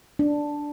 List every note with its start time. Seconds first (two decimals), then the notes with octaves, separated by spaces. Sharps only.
0.19 D4